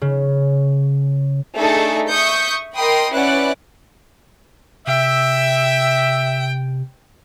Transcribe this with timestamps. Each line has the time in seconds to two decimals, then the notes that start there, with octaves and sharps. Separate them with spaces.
0.01 C#3
1.57 A3 D4 D#4 G#4 A4
2.10 E5 C#6 D#6 G6 C#7
2.76 A#4 D#5 G5 B5 C6 D#6
3.11 C#4 E4 B4 D5 F#5 F#6
4.87 C3 E5 G5